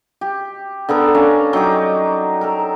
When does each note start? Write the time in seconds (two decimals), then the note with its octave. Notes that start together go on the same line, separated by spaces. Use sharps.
0.21 G4
0.89 D3 B3 A4 A#4
1.15 C#4 D4 F5 A#5
1.53 F#3 D#4 G4 D6
2.41 A4 A#4